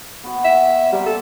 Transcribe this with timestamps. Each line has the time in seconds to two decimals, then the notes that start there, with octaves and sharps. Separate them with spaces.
0.24 B3 F#4 G5
0.45 E5
0.93 G3 A#3 C4
1.06 A4